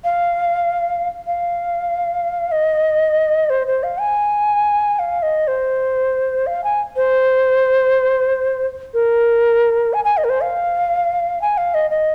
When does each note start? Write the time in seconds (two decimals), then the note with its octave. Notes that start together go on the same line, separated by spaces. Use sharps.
0.04 F5
1.27 F5
2.52 D#5
3.50 C5
3.67 C5
3.83 F5
4.00 G#5
4.99 F5
5.23 D#5
5.47 C5
6.47 F5
6.64 G#5
6.96 C5
8.94 A#4
9.93 G#5
10.05 G#5
10.17 D#5
10.24 A#4
10.29 C5
10.42 F5
11.41 G#5
11.58 F5
11.74 D#5
11.90 D#5